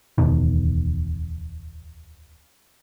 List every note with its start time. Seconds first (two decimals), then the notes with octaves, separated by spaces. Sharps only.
0.18 D1 E2 B2 D#3